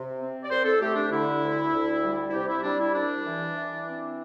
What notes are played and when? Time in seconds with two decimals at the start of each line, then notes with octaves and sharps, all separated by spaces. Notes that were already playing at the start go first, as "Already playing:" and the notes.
Already playing: C3
0.19 C4
0.44 D5
0.49 C2 C5
0.65 A4
0.80 A3 G4
0.95 D4
1.11 D3 E4
1.42 D2
1.72 D2
2.02 G3
2.29 E4
2.33 C3 G4
2.48 E4
2.63 G3 D4
2.79 E4
2.94 C2 D4
3.25 E3
3.56 E3
3.86 C4